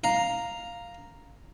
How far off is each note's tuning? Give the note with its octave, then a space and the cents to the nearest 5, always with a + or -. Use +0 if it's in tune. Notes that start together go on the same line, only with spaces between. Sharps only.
F5 +0 A#5 +0